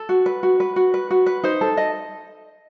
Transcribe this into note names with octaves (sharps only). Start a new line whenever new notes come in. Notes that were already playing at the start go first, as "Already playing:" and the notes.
Already playing: A4
F#4
B4
F#4
B4
F#4
B4
F#4
B4
D#4 C5
A4
D#5